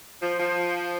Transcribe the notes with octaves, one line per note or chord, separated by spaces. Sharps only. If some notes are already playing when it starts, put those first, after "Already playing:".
F3
F3